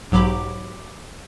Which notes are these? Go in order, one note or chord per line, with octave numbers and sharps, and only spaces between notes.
B1 G#2 F#3 G4 B5 D6